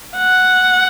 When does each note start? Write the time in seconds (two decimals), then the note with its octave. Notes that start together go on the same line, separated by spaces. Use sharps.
0.17 F#5